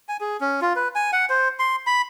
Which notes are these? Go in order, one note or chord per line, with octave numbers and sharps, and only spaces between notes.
G#5
G#4
C#4
F4
B4
G#5
F#5
C5
C6
B5